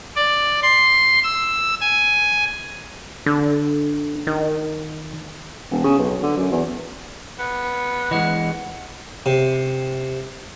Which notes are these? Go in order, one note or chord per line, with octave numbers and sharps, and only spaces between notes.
D5
C6
E6
G#5
D3
D#3
E1
C#3
B1
D3
F#2
E2
B3
E3 G#3 D#5 F#5
C3